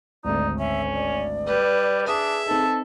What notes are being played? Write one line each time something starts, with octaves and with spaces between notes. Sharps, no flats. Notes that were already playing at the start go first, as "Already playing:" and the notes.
G#1 D2 D#4 D5
C#4 E5
D5
G3 B4
D4 G#4 E5 A5 D#6
C4 D#4 A4